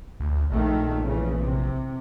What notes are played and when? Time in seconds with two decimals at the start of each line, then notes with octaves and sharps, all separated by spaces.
0.20 D2
0.51 A#1 D#3 A3
1.03 C#3 E3
1.40 C3